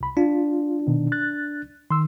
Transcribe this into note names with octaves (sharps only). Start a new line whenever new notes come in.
C2 B5
D4 F4
B2 D#3
F#6 A6
D#3 C6 E6